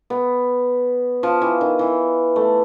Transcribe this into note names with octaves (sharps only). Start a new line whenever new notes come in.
B3
F3
E3
D#3
E3
A3